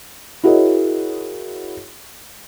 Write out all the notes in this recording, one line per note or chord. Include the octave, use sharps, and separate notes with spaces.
E4 F#4 G#4 A#4 C#5 D#5